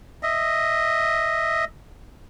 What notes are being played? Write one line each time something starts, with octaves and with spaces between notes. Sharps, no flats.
D#5 E5